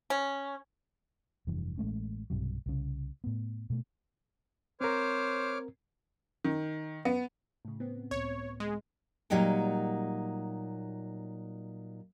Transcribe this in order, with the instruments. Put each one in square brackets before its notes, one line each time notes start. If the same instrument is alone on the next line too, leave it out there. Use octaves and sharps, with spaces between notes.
[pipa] C#4
[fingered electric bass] F1 G2 E3
A1 G#3 A3 C#4
B1 G2 C3 F#3
C2 C#3
A2 B3
B2 A3
[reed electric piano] C4 A#4 [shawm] C5 [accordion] C#5 D6 F6
[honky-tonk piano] D#3
B3
[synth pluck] A2 C#3
B3 C4
[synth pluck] C#2 A2 [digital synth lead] C#5
[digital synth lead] G#3
[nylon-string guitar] A#2 F#3 G3 D#4 F#5 G5